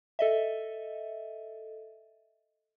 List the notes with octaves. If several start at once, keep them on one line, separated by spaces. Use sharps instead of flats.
A4 D#5 E5